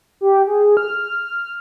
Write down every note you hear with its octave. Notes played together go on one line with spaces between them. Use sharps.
G4
G#4
F6